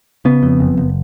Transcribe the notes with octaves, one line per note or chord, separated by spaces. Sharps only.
C#3 B3
F2
F#1
F#1